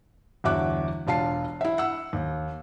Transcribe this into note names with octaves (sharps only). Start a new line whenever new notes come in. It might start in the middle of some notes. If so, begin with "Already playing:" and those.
G1 E2 F#4 E5 D6 F#6
E1 D4 F4 A5 C7
E4 E5
F#5 E6
D#2